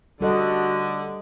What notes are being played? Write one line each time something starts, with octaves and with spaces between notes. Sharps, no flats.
D3 G3 F#4 A4 D#5